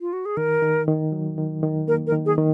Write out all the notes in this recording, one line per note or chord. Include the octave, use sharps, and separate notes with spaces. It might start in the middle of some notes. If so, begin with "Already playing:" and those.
F4
F#4
G#4
D#3 A#4
D#3
D#3
F#3
D#3
D#3
A#3 A#4
A#4
D#3
G#4
D#3